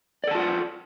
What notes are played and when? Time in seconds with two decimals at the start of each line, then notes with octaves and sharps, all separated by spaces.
0.24 D5
0.27 A4
0.31 A5
0.35 F4
0.39 F#5